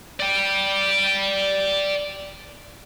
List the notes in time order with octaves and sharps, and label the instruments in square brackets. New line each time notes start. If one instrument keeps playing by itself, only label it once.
[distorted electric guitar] D5 G5